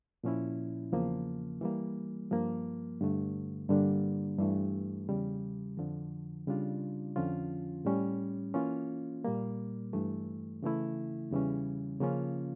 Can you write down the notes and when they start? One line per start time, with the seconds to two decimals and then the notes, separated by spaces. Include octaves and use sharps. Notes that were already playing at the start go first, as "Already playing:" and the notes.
0.24 A#2 F3 C#4 E4
0.92 E2 C#3 F3 A#3
1.61 E3 G3 A#3
2.31 G2 F3 A#3
3.01 G2 D3 A3
3.69 G2 D3 G3 A#3 D4
4.39 G2 E3 A3
5.09 E2 C#3 G3
5.77 F2 D3 F3
6.47 C#3 G3 D4 F4
7.16 F2 D3 F3 C#4 F4
7.85 A2 G3 C#4
8.54 E3 A#3 C#4 F4
9.24 A#2 G3 A#3
9.93 G2 E3 A3
10.63 C#3 E3 A3 E4
11.31 E2 C#3 E3 G3 C#4
12.00 C#3 F3 A#3 C#4 F4